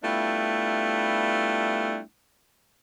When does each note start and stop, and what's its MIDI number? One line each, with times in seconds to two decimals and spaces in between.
0.03 2.00 55
0.03 2.00 57
0.03 2.00 59
0.03 2.00 62
0.03 2.00 64
0.03 2.00 65